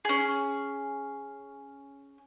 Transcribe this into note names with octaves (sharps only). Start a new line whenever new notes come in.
C#4 G#4